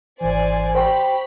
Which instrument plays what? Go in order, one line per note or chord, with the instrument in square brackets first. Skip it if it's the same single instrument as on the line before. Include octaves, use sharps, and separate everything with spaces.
[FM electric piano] G#1 E3 [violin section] C5 D5 G#5
[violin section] G4 B5 [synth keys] C5 G5 C#6